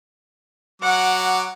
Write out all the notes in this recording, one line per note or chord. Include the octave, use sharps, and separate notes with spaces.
F#3 F#5 D6